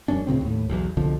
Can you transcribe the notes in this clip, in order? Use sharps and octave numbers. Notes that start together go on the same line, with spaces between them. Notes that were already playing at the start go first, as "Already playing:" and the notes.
E1 F#2 C#4 D4
D2 A#2 C#3 C4
D#2 A2
B1 E2
C2 B2 D3 F3